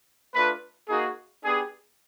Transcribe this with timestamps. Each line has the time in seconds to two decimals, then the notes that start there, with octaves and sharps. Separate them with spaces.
0.34 A3 D4 F4 B4
0.89 A#3 D#4 F#4 G#4
1.44 B3 D4 G4 G#4